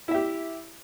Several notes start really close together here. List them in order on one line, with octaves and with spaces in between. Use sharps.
E4 E5 G4